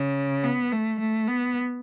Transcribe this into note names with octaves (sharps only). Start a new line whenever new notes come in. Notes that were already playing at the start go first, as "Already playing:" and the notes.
Already playing: C#3
B3
A3
A3
B3